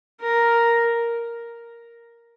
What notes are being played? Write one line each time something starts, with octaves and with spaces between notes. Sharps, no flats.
A#4